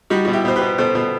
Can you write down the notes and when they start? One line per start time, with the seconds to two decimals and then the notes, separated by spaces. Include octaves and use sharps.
0.10 G3 D#4 F#4
0.25 B2 F#4
0.33 E4 G4
0.45 B2 C5
0.56 G4 B4
0.62 B2
0.78 B2 A4 C5
0.95 B2